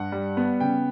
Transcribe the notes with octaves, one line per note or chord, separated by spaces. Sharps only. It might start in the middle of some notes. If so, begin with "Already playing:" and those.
Already playing: G2 F#5
G3
B3
C#3 G5